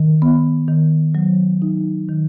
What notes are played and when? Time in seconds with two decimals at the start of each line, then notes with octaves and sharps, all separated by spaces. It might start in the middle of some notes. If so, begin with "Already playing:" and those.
Already playing: D#3
0.22 B3
0.68 D#3
1.15 F#3
1.62 D#4
2.09 D#3